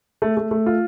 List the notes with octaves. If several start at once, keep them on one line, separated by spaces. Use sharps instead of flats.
A3
A3
A3
F4